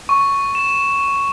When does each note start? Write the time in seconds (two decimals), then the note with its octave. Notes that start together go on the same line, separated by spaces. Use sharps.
0.09 C#6
0.55 E7